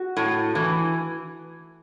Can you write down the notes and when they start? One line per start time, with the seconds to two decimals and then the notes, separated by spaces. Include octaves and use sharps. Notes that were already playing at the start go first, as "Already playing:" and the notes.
Already playing: F#4
0.17 A2
0.55 E3